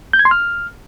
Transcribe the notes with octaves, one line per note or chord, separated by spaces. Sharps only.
G6
G#6
C6
F6